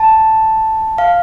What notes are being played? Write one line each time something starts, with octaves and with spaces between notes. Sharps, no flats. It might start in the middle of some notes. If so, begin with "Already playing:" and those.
Already playing: A5
F5